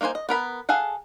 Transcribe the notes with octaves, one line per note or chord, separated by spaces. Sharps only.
A#3 D#4 F#4 C5 G#5
D#5
B3 A#4 B5
G#4 A4 F5 F#5